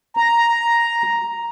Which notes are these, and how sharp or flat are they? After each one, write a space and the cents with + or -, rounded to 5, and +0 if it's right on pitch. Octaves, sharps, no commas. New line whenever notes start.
A#5 +5